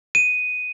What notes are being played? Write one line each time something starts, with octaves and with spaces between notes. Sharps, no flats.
D#7